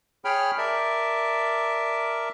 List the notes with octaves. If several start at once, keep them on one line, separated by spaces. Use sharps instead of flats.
G#4 C#5 G5 B5 F6
A#4 D5 E5 A5